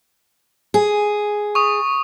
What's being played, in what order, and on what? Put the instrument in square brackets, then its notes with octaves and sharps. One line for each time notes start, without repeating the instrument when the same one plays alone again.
[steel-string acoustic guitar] G#4
[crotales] C#6 D#6